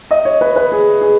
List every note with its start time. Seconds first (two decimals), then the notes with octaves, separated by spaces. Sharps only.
0.11 D#5
0.25 C#5
0.41 B4
0.56 B4
0.72 G#4
1.01 G#4